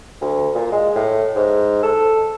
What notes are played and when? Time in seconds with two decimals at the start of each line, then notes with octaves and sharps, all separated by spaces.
0.21 D2
0.55 A#2
0.72 G#3
0.96 A2
1.35 G#2
1.83 A4